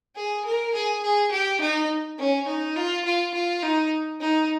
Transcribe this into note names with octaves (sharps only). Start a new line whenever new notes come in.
G#4
A#4
G#4
G#4
G4
D#4
C#4
D#4
F4
F4
F4
D#4
D#4